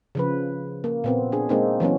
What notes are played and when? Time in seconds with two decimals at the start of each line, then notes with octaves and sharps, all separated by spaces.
0.15 C#3 F3 B4
0.84 A#3
1.04 A#2 B3 C4
1.32 D4 G#4
1.49 G#3 A#3 C4 D#4
1.80 E3 F#3 B3 C#4